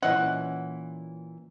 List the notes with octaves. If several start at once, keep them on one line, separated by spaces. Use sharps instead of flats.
A#2 E3 C#4 D#5 E5 F#5